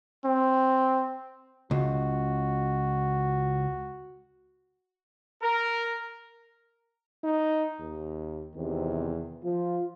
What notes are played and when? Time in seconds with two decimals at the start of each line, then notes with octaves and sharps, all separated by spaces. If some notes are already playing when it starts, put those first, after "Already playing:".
0.25 C4
1.71 C#2 F#4
5.43 A#4
7.24 D#4
7.79 D#2
8.55 E2 C3 D#3
9.45 F3 F4